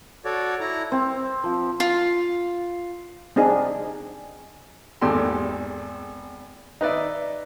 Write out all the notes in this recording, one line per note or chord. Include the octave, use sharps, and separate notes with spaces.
F#4 A4 C#5 D5
E4 A#5
C4
F3
F4
C4 D4 D#4 G#4
G#1 E2 A#2 G4 A4 C6
D#4 B4 D5 E5